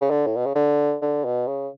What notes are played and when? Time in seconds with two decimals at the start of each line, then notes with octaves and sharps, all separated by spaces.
0.01 C#3
0.10 D3
0.26 A2
0.36 B2
0.46 C#3
0.55 D3
1.02 D3
1.25 B2
1.48 C#3